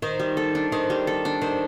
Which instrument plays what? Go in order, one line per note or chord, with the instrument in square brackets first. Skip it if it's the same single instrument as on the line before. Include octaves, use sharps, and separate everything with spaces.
[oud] D#3 [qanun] C5
[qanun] G3
A4
D4
[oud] D#3 [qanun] C5
[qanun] G3
A4
D4
[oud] D#3 [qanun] C5